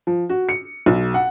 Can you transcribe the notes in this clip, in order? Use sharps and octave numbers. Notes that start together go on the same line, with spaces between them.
F3
F#4
C#7
B1
F#5